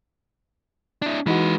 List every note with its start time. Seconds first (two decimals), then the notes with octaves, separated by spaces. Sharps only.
1.02 D4 E4
1.26 E3 G#3 D#4 F#4 B4